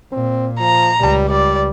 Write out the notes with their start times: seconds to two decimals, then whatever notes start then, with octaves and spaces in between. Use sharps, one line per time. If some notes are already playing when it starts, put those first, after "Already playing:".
0.12 A#2 C4
0.60 F3 A#5
1.00 C#2 G3
1.29 G3 D5